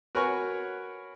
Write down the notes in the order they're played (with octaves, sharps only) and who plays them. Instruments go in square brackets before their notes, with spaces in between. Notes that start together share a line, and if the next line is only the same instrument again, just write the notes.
[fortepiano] F#4 A#4 B4 C#5 G#5 C#6